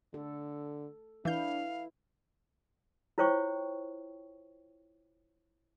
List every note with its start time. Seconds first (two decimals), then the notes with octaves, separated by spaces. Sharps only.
0.14 D3 A4
1.25 E3 D4 E4 B4 F5 G6
3.18 E4 F4 C5 C#5 G5 C#6